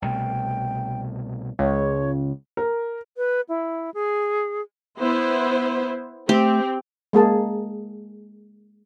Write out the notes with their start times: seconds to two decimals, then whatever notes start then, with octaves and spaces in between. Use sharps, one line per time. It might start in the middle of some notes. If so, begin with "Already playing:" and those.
0.02 C2 B2 A3 G5
1.59 C#2 C#5
2.57 A#4
3.17 B4
3.49 E4
3.94 G#4
4.99 B3 E4 C5
6.29 A3 C4 G4
7.13 G#3 A#3 G#4 A5